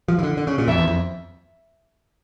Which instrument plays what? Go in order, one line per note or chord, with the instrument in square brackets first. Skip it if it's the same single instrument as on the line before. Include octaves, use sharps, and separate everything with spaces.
[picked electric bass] F3
E3
D3
D3
C#3
A#2
[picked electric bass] F2 [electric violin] E5
[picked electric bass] E2
F2